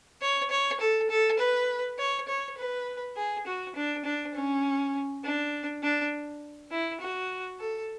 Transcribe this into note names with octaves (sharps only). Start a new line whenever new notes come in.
C#5
C#5
A4
A4
B4
C#5
C#5
B4
G#4
F#4
D4
D4
C#4
D4
D4
E4
F#4
A4